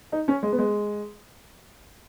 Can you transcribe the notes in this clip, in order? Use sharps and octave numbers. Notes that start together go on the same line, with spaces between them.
D#4
C#4
G#3
B3
G#3